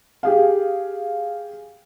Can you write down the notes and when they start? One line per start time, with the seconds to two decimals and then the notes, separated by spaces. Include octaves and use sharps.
0.23 G4 G#4 F5